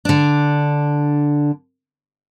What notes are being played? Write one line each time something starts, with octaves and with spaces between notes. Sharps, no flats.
D3 D4